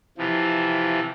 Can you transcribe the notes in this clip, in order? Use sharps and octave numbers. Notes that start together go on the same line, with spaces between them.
C3 E3 F3